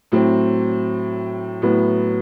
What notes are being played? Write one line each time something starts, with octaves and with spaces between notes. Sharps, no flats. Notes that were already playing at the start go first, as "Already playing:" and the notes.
A2 F#3 C4
A2 F#3 B3